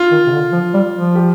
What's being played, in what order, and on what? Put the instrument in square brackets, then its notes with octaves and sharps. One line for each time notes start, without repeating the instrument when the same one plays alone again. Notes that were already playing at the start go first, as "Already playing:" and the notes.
Already playing: [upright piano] F4
[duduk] D#3
C3
D3
F3
G3
F3
[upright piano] G4